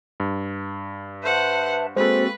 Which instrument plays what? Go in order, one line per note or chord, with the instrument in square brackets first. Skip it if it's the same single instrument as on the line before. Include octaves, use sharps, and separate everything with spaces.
[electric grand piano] G2
[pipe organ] B4 E5 A5 [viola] C5 F#5
[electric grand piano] G#3 A4 [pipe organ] A#3 C4 F#4 [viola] B4 [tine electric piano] C5